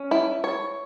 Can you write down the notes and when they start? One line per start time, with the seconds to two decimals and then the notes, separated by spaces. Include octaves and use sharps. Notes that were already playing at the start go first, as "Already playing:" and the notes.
Already playing: C#4
0.11 E4
0.44 C#5